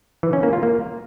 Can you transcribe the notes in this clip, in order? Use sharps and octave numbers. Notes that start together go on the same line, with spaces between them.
E3
C#4
A#3
F4
A#3